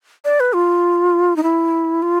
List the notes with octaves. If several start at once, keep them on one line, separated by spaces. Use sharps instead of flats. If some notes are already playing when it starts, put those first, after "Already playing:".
D5
B4
F4
D#4
E4
F4